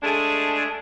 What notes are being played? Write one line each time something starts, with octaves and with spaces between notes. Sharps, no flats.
G#3 A3 D4 G#4